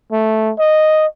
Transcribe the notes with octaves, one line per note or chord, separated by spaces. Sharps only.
A3
D#5